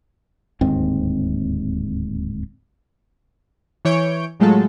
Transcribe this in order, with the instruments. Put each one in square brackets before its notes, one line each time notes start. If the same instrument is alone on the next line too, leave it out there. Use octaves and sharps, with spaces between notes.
[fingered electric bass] D1 D#2 G#2 C4
[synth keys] E3 C#5 G6 D7
A2 F#3 G#3 A3 F4 A4